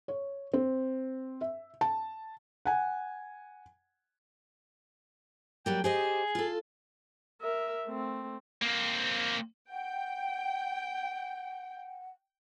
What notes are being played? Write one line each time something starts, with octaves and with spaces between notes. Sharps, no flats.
C#5
C4
E5
A5
F#5 G#5
F#3 G3 A#3 G5
G4 G#4 C5 D#5
F4 A4
A#4 E5
A3 C4
A#3 C4
F#5 G5